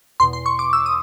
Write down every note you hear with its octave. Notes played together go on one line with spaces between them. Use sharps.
E2 B2 C6
C6
C#6
D6
E6
D#6